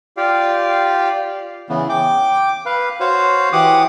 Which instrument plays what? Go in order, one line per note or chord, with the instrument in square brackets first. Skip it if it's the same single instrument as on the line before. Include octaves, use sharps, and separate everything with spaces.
[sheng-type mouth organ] F4 G4 D5 F5 G5
[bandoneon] C#3 E3 B3
G5 D6
B4 F5
F#4 C5 C#5 F5
E3 G4 F#5 D6 D#6